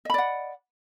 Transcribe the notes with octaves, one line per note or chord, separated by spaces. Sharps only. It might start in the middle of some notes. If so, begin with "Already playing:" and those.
D5 D#5 F#5 B5